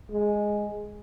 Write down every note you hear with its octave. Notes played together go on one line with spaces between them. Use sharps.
G#3